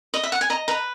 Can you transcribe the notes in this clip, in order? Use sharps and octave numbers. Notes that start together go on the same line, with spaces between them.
D#5
E5
F#5
G#5
D#5 A#5
B4 A#5